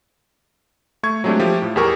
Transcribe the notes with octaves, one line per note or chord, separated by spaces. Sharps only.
A3 C#6 G#6
F#3 G#3 A3 C4 D4 G4
F3 A3 G4
A2
E2 G4 G#4 A#4 C#6